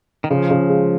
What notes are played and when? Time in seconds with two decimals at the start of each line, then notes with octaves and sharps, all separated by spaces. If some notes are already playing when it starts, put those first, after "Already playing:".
0.24 D#3
0.30 C#3 F3
0.50 C#3
0.69 G#3